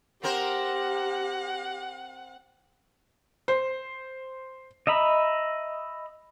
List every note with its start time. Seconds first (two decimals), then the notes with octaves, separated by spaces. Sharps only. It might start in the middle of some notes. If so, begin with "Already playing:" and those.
0.23 C4 G4 A#4 C5 F#5
3.48 C5
4.87 D#5 E5 A#5 B5